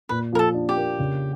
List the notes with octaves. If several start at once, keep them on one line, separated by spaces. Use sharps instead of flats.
A#2 B4
F3 A#4
A4
D4
G4
A#3
C#3